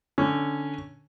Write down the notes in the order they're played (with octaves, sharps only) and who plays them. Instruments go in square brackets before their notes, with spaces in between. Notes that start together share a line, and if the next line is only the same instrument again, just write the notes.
[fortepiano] D3 C#4